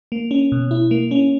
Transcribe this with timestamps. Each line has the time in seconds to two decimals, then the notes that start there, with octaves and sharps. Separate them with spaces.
0.12 A#3
0.31 C#4
0.52 B2
0.71 E4
0.91 A#3
1.11 C#4